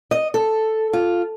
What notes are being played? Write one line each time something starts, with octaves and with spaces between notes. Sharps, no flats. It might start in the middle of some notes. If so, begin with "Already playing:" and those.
D#5
A4
F4